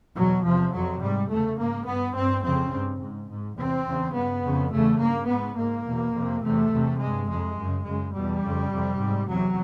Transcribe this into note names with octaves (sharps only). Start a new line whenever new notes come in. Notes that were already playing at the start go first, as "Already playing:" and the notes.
E2 B2 F#3
E2 C3 F3
F2 C3 F#3
G#2 G3
E2 C#3 A3
G#2 A#3
G2 B3
G2 C4
F2 C#3 C4
G2
G#2
G#2
E2 C3 C4
E2 C#3
G2 B3
F2 C#3
E2 C#3 A3
G2 A#3
G#2 B3
G#2 A#3
E2 B2
F2 C3
E2 C3 A3
E2 C3
G2 G#3
F2 C3 G#3
F#2 C#3
F#2 C#3 G#3
B2 G3
E2
F2 C#3
F2 C3
G#2
E2 C3 F#3